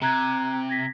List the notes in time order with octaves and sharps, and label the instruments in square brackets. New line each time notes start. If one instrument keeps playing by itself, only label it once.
[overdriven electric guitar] C3 [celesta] A#5 F#6 G#6
[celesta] G#6 A#6 B6